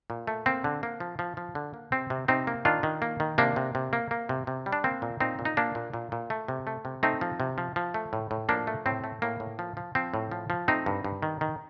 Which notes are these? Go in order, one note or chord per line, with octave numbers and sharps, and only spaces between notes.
A#2
A3
A#3 C4
D3
A#3
F3
F3
F3
D3
A#3
C3 C4
C3
C3 C4 D#4
A#3
D#3 D4 F4
D#3
A#3
D#3
C3 A#3 D4
C3
C3
A#3
A#3
C3
C3
G3
D4
A#3 C4
A#2
A#2 C4 D#4
A#2
D#4
A#2 A#3 D4
A#2
A#2
A#2
A3
C3
A3
C3
A3 C4 D#4
F3
C3
F3
F3
A3
A2
A2
F3 A#3 D4
A3
A2 C4
A3
A2 A#3
A2
F3
F3
F3 C4
A2
F3
F3
A3 C4 D#4
G2
G2
D#3
D#3